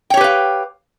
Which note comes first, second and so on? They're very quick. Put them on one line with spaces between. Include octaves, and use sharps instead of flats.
G5 C#5 G4 B4 F5